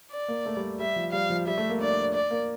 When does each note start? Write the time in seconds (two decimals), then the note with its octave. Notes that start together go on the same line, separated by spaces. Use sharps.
0.11 D5
0.28 A#3
0.46 A3
0.56 G3
0.79 G3 E5
0.96 F3
1.12 G3 F5
1.30 F3
1.47 G3 E5
1.58 A3
1.70 A#3
1.81 D4 D5
1.91 D4
2.02 D4
2.14 D5
2.31 A#3